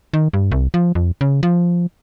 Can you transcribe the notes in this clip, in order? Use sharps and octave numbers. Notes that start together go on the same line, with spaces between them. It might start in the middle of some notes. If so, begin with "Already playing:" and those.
D#3
G2
C2
F3
F2
C#3
F3